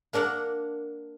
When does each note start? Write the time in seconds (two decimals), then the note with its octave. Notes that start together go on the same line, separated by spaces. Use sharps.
0.13 A#3 D4 A#4 F#5